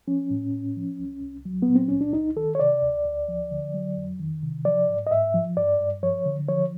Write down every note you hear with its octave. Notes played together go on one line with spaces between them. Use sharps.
F3 C#4
A2
A2
F3
C2
C2
F#3
B3
A#2
C4
C#2 C#4
D4
C#2 D#4
D#3 A4
C#5
C3 D5
D2
D2
F3
D3
F#3
F2
D#3
C3
F3 D5
G#2
D#5
G#2 E5
F3
G2 D5
G2
F3 C#5
D3
F3 C#5